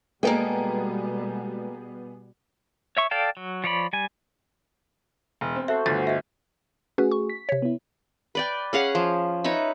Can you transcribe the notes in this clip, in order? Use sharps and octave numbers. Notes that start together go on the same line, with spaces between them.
B2 G3 G#3 A#3 B3 G#4 A4 G5
C#5 E5 C#6
A4 D5 F5 G5 A5
F#3
F3 C#5 D5 B5
G3 G#5
E1
C4
F#4 A4 C5 E5
G1 D2 A6
D#5 E5
A3 C#4 F#4 G#4 B4
C#6
B6
C3 C#5
B3 E4
B4 D5 G5
C#4 G#4 F5 F#5
F3
D#4 B4 C#5 E5